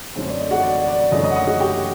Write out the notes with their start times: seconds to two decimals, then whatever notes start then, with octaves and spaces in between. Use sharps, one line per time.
0.15 F#2 D3 A3 C4 D#4
0.28 D5
0.39 D#5
0.51 F#4 F#5
0.63 D5
0.76 D5
0.88 D5
1.00 D5
1.12 F#1 F#2 D3 A3 D#4 D#5
1.24 D#5
1.31 F#5
1.36 D#5
1.47 F#4 F#5
1.60 G4 G5